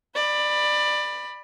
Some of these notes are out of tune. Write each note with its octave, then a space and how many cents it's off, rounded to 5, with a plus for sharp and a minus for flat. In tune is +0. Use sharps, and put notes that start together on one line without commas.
D5 +20 B5 +0